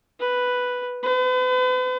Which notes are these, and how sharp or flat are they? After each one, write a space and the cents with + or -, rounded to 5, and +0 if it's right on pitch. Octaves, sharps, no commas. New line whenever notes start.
B4 +0
B4 +40